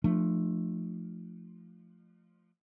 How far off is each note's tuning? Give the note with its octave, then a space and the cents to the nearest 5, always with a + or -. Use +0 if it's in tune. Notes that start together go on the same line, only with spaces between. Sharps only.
F3 +0 A3 +0 D4 +45